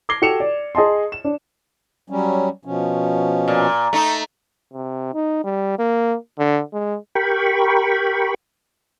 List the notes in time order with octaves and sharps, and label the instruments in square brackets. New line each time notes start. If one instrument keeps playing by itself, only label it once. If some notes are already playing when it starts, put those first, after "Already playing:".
[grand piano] D6 G#6 A#6 C7 G7
F#4 G4 A4 C#7 E7 F7
D5
G#4 D#5 A5 C6
E7
D4
[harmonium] F#3 G3 C#4
B2 F3 C#4
[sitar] A#2
[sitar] A3 D#4 [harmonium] A#5
[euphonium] C3
D#4
G3
A#3
D3
G#3
[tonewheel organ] G4 A#4 G5 B5 C#6